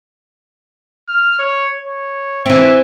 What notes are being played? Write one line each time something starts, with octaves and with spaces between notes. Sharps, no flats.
F6
C#5
C#5
E3 C4 E5